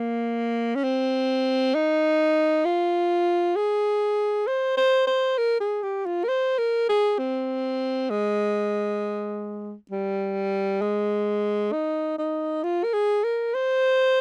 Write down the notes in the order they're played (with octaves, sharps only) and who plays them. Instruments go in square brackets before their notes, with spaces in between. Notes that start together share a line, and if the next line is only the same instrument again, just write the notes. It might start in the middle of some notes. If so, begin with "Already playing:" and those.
Already playing: [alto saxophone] A#3
C#4
C4
D#4
F4
G#4
C5
C5
C5
A#4
G#4
G4
F4
A#4
C5
A#4
G#4
C4
G#3
G3
G#3
D#4
D#4
F4
A#4
G#4
A#4
C5